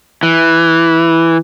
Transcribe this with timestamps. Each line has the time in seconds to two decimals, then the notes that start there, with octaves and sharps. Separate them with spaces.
0.23 E3